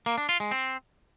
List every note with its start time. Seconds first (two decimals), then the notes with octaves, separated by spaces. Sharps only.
0.06 A#3
0.18 D4
0.29 F4
0.40 G#3
0.51 C4